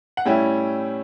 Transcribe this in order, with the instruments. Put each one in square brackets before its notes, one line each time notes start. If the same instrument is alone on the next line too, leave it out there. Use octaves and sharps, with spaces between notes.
[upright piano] F#5
A2 G3 C#4 E4 G5